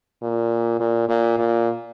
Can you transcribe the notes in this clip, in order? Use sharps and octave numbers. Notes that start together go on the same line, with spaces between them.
A#2
A#2
A#2
A#2